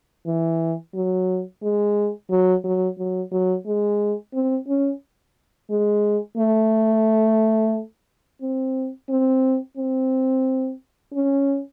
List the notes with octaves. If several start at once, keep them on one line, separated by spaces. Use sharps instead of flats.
E3
F#3
G#3
F#3
F#3
F#3
F#3
G#3
C4
C#4
G#3
A3
C4
C4
C4
C#4